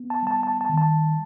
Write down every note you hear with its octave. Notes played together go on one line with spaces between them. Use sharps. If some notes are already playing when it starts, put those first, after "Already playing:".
Already playing: B3
A5
G3 A5
A5
A5
D#3
A5